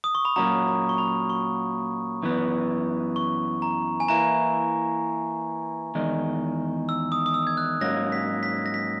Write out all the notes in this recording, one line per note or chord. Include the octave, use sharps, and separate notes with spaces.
D#6
C#6
B5
A#2 F#3 A#3 C#4 F#4 A#5
A#5
C#6
B5
C#6
F#2 E3 B3
C#6
A#5
G#5
E3 A#3 E4 A#5
E2 D#3 G#3
E6
D#6
D#6
E6
G#6
F#6
G#2 F#3 A#3 C#4 A#6
B6
B6
A#6
B6